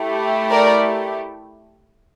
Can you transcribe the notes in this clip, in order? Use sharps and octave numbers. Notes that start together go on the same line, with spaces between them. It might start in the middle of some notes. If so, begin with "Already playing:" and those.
Already playing: A3 E4 G4
A#4 D5